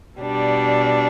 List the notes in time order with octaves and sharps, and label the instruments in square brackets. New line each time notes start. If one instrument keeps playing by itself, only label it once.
[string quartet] B2 G3 D4